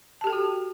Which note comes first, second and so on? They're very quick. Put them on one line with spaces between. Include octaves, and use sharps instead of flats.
A5 G4 A4 G5 F#4